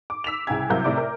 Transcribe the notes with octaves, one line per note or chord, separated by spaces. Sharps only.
D6
E6 B6 E7 F7
C2 C#3 G5 G#5 G#6
C2 C3 F#3 A#4 F5 G6
A2 C3 D5 D6
A#4